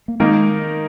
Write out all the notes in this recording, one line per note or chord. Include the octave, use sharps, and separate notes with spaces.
A#3
D#3 G#3 A#3 D#4 A#4